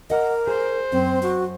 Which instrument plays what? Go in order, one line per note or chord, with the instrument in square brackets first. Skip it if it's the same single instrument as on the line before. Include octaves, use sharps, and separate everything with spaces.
[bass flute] A#4 [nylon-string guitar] D#5 F#5
[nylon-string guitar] G#4 [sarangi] C5
[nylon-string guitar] F#2 [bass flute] C4
[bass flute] F#4